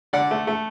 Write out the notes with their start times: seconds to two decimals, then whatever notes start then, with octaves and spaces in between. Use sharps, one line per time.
0.13 D3 D5 F#5
0.31 A3
0.47 A3